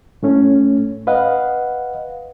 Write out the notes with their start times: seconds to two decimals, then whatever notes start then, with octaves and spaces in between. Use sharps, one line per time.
0.23 A2 A3 C#4
1.07 B4 D#5 F5 F#5